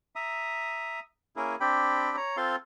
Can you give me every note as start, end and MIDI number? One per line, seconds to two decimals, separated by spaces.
0.16 1.00 76
0.16 1.00 82
0.16 1.00 87
1.36 1.56 58
1.36 1.56 61
1.36 1.56 64
1.36 1.56 68
1.36 1.56 70
1.60 2.16 60
1.60 2.16 62
1.60 2.16 67
1.60 2.16 79
1.60 2.16 83
2.17 2.36 73
2.17 2.36 82
2.37 2.56 60
2.37 2.56 65
2.37 2.56 69
2.37 2.56 77
2.37 2.56 84